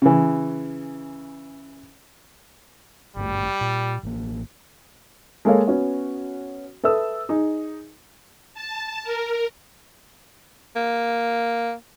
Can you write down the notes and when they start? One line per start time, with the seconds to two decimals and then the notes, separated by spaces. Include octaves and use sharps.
0.02 C#3 E3
3.17 G#1 G2 G3 A3
3.61 A#2
4.03 A1 A#3
5.45 G#3 A#3 A4 A#4 C#5 F5
5.67 B3 C#4 F#4
6.84 A4 B4 E5 D#6 E6
7.29 D#4 G#4
8.54 A5
9.03 A#4
10.76 A#3